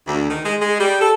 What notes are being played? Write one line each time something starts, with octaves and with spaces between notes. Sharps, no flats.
D2
D#3
G#3
G#3
G3
A4